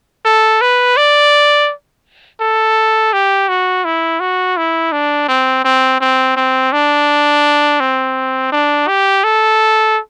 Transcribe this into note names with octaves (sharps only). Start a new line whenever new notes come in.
A4
B4
D5
A4
G4
F#4
E4
F#4
E4
D4
C4
C4
C4
C4
D4
C4
D4
G4
A4